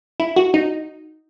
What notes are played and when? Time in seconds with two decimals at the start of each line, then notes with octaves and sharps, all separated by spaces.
0.20 E4
0.36 F#4
0.54 D#4